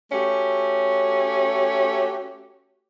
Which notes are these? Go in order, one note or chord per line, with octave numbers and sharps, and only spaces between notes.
A3 C#4 F#4 G4